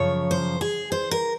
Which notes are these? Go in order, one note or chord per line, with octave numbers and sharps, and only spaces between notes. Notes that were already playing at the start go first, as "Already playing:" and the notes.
Already playing: F#2 C#3 F3 C#5
C5
G#4
C5
A#4